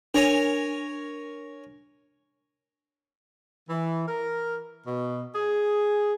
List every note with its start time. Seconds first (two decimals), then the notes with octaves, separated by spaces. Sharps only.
0.14 D4 A#4 C#5 G#5
3.70 E3
4.08 A#4
4.87 B2
5.35 G#4